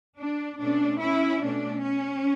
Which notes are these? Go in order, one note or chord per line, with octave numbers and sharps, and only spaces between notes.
D4
B2 A3 C#4 D4
C#4 E4
B2 A3 C#4 D4
C#4